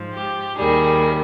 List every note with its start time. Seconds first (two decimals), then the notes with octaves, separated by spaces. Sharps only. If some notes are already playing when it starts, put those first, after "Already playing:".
Already playing: G#2 F3
0.13 G4
0.57 D#2 D#3 G3 G#4